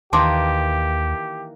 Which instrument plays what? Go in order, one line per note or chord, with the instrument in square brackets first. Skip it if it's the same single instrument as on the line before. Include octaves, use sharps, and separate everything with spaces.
[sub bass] D#2 [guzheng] D#3 E3 A#3 [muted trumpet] G4 [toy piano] A5 C6 D6